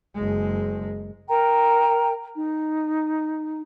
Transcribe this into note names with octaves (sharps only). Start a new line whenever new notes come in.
F#1 G#3
A#4 G5 A#5
D#4